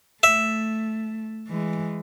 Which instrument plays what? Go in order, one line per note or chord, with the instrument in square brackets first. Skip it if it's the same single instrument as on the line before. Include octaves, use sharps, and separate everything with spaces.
[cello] A3 [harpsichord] E5
[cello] E3 G#3